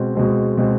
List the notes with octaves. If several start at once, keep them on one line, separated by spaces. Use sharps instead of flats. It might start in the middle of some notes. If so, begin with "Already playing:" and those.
Already playing: B2 G#3 C4
B2 G#3 C4
B2 G#3 C4